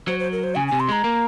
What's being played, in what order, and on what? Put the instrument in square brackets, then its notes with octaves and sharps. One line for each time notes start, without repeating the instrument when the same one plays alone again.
[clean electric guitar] F#3 [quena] C5
[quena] C5
A#4
C5
[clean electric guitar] C#3 [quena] G#5
[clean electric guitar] C3 [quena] G#5
[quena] C6
[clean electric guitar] G#3 [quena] A#5
[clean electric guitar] A#3